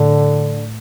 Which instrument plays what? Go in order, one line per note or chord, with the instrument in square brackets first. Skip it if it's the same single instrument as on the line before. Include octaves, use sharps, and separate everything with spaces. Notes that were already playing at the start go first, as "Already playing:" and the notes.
Already playing: [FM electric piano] A2 [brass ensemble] D3